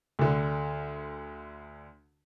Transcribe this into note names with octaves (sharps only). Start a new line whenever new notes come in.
D2 D3